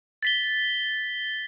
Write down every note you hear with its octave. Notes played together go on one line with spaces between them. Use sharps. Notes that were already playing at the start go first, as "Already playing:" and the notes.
A6 B6 G7